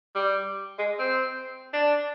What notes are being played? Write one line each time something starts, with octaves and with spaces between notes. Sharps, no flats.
G3
G#3
C4
D4